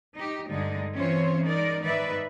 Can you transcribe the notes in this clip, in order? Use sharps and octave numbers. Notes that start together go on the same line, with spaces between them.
D#4 G4
G2 D3 G#3 D#4
E3 C4 C#4 F4 C5 C#5
G#3 D#4 A#4 D5
G#2 D#3 D#4 B4 D5 E5